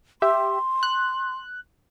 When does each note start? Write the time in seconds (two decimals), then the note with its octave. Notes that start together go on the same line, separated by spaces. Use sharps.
0.22 G4 E5 C6
0.83 F#6